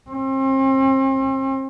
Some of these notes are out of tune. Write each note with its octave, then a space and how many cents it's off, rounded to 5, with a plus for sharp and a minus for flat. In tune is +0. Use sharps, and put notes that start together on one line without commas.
C4 +40